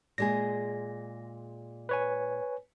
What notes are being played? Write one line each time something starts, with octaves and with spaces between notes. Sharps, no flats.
A#2 G#3 G#4 A#6
B4 C#5 G#5